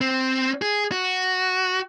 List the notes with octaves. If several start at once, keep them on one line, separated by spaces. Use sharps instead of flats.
C4
G#4
F#4